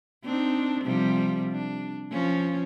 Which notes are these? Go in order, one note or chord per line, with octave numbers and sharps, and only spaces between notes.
C4 D4 D#4
C3 F3 G3
D4
F3 C#4